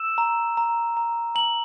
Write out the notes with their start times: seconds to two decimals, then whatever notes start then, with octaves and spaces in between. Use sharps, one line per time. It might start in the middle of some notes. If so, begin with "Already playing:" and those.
Already playing: E6 E7
0.18 A#5
0.57 A#5
0.97 A#5
1.35 A#5 F#7